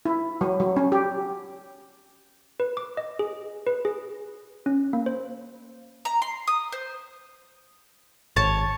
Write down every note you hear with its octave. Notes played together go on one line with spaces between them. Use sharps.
E4
F#3
F#3
C#4
G4
B4
D6
D#5
G#4
B4
G#4
C#4
A#3
C5
A#5
C6
D#6
C5
G#1 C#5 A5